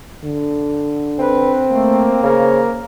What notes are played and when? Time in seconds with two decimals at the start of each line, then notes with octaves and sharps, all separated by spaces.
0.24 D3
1.19 C4 B4
1.70 A3 A#3
2.23 C#3 A#4 C5